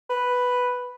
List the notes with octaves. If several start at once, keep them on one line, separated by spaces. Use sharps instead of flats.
B4